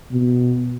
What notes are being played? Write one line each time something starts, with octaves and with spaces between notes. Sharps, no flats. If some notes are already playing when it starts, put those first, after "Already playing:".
B2